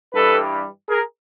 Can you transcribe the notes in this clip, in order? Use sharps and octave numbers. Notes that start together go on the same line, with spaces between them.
G2 E3 G3 A4 B4
G#4 A#4